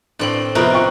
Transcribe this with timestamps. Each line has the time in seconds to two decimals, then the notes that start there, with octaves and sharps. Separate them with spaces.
0.19 A2 C4 D4 F#7
0.55 C3 F3 B3 D#4 F#4 A#4
0.74 G5 C#6 F#6